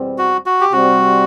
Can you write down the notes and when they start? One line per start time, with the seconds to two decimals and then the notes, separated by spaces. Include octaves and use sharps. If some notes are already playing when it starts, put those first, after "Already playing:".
Already playing: E2 B2 G3 C4
0.18 F#4
0.46 F#4
0.61 G4
0.72 C3 G3 C4 F#4